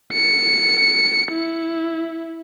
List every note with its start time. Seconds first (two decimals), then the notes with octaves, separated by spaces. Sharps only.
0.13 C#7
1.32 E4